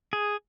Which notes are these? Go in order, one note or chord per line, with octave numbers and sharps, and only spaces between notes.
G#4